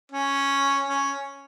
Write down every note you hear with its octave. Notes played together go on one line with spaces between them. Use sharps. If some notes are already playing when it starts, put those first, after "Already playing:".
C#4
C#4